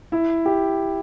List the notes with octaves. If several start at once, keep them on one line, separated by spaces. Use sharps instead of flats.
E4
G4